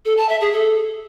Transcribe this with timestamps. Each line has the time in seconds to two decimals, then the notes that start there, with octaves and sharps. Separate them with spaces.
0.05 A4
0.17 A5
0.29 E5
0.41 G#4
0.53 A4